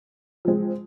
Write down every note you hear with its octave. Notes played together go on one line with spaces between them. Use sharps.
F3 G#3 C4